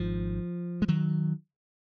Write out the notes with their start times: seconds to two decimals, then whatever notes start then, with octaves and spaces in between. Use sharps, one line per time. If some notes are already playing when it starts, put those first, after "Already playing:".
Already playing: G#1 G#2 F3
0.82 G#3
0.88 D#3 F#3